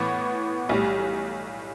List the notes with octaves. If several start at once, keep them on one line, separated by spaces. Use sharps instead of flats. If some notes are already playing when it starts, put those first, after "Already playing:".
Already playing: A2 E3 B3
B1 A2 G3